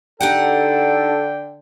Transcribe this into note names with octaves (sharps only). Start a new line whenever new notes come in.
D3 D#4 G4 A4 F#5 G5